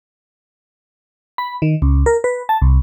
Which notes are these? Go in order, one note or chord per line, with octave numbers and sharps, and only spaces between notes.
B5
D#3
C#2
A#4
B4
A5
C2